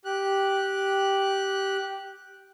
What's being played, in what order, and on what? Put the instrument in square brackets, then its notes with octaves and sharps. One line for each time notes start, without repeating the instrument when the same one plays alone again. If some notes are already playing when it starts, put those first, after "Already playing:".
[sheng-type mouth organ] G4 F#6